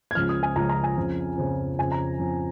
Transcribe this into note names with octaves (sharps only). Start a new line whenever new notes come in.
G#6
C#2 C#3 F3 F6
D#6
G#5
C#2 C#3 F3 A#5
A#5
G#5
F2 C#3 F3
F2 C#3 F3
F2 C#3 F3 G#5
A#5
F2 C#3 F3